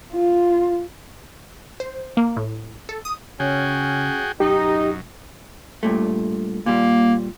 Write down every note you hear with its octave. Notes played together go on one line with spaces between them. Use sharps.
F4
C5
A#3
A2
A4
D#6
C#3 C#4 F#4 G#4 G5
E1 F#2 D#4 G4
G2 A#2 A3
A#2 G3 A#3